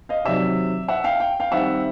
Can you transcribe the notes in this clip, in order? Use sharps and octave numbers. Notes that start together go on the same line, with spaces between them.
D#5 F5
C3 D#3 F#3 D5 E5
E5 F#5
F5 G5
G5
F5 G5
D#3 G3 C4 E5 F#5